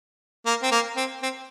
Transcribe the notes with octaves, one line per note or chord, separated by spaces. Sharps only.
A#3
C4
A#3
C4
C4